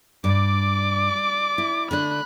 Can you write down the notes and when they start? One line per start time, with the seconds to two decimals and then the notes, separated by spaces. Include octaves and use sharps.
0.24 G2 D5 D6
1.58 E4
1.91 D3 A3 D4 B5 F#6